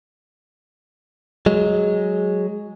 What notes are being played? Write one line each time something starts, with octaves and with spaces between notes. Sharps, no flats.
F#3 G#3